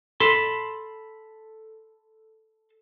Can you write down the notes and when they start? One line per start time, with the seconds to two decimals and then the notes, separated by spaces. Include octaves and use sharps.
0.20 A4 A5 B5 C6